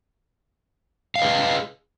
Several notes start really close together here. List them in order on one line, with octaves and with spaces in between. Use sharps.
F5 D#5 B4 G#4